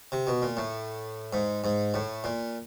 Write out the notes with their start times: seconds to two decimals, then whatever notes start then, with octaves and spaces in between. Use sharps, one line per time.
0.12 C3
0.27 B2
0.42 A#2
0.57 A2
1.33 G#2
1.64 G#2
1.94 A2
2.24 A#2